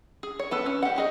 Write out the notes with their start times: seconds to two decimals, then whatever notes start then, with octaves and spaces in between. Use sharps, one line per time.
0.23 G#4
0.39 C#5
0.51 B3 A4 B4
0.66 C#4
0.83 G4 F#5
0.96 G4 G#4 D#5